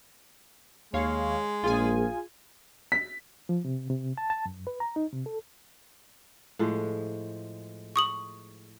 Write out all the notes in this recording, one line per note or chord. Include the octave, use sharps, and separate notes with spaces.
D#2 G#3 C#5 F5
A#1 F4 G#4 G#5
B6
F3
C3
C3
A5
A5
F#2
B4
A#5
D#4
C3
A4
A2 F3 G#3
C#6 D#6 F#7